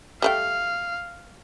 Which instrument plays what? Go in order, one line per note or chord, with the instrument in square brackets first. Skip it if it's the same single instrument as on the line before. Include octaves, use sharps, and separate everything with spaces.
[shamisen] G3 A3 G5 [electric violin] F5